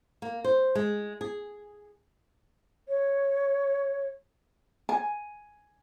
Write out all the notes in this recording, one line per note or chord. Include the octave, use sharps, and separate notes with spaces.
A#3
C5
G#3
G#4
C#5
G#5